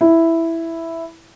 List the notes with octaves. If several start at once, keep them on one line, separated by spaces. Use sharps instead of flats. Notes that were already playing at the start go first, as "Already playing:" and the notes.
E4